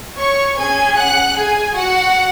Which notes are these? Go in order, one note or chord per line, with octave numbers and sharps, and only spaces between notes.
C#5 C#6
C#4 G#4 G#5 G#6
F#5 F#6
G#4 G#5
F#4 F#5